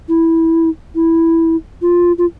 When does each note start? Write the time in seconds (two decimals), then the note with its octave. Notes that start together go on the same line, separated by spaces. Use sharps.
0.09 E4
0.95 E4
1.82 F4
2.18 F4